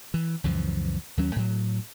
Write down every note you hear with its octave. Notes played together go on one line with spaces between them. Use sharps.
E3
C#2 F#2 E3 F3
D#2 F#3 C#4
A2 F#3